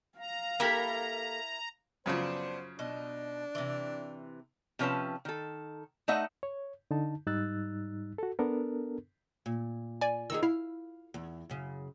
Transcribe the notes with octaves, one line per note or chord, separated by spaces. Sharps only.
F5 A#5
A#3 E4 G4 A4 A#4 B5
F#2 C#3 F3 B3 D4 C5
B2 D4 D#4
C3 E3
C3 F3 C#4 B4 A5
D#3 A4
A3 D#4 D#5 E5 F#5
C#5
D3 D#4 A5
G#2 G3 D#4 E6 F#6 A6
F#4 A4
B3 D4 A4 A#4
A#2
D5 G#5
D#3 D#4 G#4 E6
E4 F5
E2
F#2 C#3